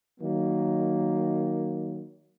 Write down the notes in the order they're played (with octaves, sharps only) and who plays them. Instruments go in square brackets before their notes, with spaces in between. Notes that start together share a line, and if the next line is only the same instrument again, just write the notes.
[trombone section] D#3 F#3 A#3